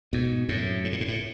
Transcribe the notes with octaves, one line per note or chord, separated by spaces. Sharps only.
G#2 B2
F#2 A2
G#2
A2
G#2
A2